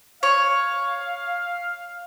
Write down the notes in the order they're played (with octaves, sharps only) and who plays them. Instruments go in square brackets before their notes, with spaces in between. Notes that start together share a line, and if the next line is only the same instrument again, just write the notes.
[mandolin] C#5 [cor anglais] F5